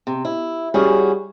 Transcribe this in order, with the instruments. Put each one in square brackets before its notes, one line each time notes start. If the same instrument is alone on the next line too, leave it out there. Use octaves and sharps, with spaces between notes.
[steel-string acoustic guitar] C3
E4
[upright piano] G3 [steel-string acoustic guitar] C#4 F#4 G#4